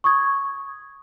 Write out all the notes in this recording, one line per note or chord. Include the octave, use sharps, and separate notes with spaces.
C#6 D#6 G#6